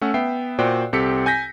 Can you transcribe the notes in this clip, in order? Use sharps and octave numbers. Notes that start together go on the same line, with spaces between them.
A3 C#4 F#5 E6
B3 E5 G5 C7
A#2 F#4 C5 D5 G5 F#6
C2 C4 G4 A4 B6 C#7
G#5 G6 A#6 B6